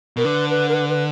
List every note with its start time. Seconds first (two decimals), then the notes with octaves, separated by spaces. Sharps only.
0.17 B2 A#4
0.25 D3 B4
0.50 B4
0.69 A#4
0.73 B4
0.89 B4